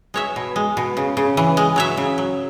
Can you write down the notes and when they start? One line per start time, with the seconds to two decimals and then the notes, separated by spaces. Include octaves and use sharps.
0.14 G#3 C#5 E5
0.36 B2
0.56 G#3
0.77 B2
0.97 C#3
1.17 C#3
1.37 E3
1.57 G#3
1.76 F#3 C#5 E5
1.97 C#3
2.18 F#3